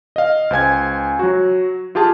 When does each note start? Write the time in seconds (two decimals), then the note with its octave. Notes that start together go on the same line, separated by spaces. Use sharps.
0.16 D#5 F5
0.51 C#2 C5 G#5 G#6
1.19 F#3 F#4
1.95 F4 G4 G#4 A5